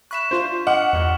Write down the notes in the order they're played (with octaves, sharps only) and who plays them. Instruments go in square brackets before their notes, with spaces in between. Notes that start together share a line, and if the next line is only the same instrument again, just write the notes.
[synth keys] E5 B5 F#6 [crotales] C#6 B6 E7
[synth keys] D4 F4 F5 [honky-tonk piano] C5
[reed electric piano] D#5 [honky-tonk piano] F#5 [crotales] D6 F6 F#7
[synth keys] E2 G2